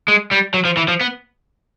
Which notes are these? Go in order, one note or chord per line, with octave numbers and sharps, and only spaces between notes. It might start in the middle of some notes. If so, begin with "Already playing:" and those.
G#3
G3
F#3
F3
E3
F3
B3